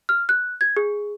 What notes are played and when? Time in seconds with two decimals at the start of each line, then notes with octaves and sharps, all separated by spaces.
0.09 F6
0.29 F#6
0.61 G#6
0.77 G#4